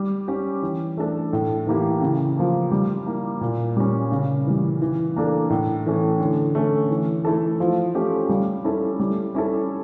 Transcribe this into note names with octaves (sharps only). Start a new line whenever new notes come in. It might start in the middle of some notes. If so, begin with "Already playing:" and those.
Already playing: G3
C#4 G4
E3
A3 D4 A4
A2
E3 A#3 E4 G4
C#3
F3 A#3
G3
A#3 E4
A#2
G3 C#4
C#3
E3 G3
E3
A#3 D4 A4
A2
E3 A3 C#4
D3
A3 C#4
E3
A3 E4 A4
F3
A3 C#4 G4
G3
C#4 E4 A4
G3
C#4 E4 A4